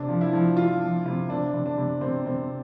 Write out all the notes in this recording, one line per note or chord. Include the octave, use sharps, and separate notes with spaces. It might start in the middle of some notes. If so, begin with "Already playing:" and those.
Already playing: C3 D4
F3
E4
F3
F3 F4
F3
C3
C3 D4
C3
D4
C3
C3 C4
C3 C4